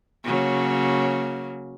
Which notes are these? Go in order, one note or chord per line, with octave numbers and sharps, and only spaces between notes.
C#3 F#3 A#3